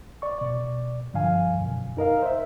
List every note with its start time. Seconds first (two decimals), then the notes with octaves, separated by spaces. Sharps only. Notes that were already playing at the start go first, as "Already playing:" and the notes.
0.22 D5 C#6
0.38 B2 D5
1.14 G2 D3 F3 F5 G#5
1.61 F#2 B2
1.97 D#4 A#4 D#5 F5
2.22 C5 E5